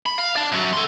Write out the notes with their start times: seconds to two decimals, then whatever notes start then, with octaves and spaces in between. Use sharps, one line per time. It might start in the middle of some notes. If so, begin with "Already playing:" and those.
0.06 B5
0.18 F5
0.36 D5 A5
0.52 F#2 F#3
0.73 A4 C6